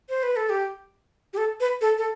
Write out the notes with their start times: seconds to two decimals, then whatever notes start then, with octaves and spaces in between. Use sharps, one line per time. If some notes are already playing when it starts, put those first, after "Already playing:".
0.09 C5
0.23 B4
0.36 A4
0.50 G4
1.33 G4
1.37 A4
1.60 B4
1.81 A4
1.98 A4